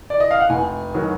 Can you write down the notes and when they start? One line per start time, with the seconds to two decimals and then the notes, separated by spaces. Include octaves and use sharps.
0.10 D5
0.20 D#5
0.31 F5
0.41 F#5
0.50 F1 G#5
0.94 D#3 F#3